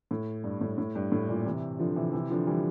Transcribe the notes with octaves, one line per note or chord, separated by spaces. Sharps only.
A2
G2
A2
A2
G2
A2
G2 A#2
C3 E3
D3 F3
C3 E3
C3 E3
D3 F3
E3 G3